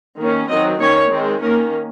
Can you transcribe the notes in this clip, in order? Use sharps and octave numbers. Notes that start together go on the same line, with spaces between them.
D#3 A#3 C#4
D#3 F#3 C4 D#5
D#3 A#3 C#4 C#5
D#3 G#3 C4
D#3 A#3 C#4 A#4